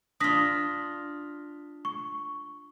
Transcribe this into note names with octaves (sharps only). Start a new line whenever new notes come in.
D4 F4 D#6 A#6 B6
C#6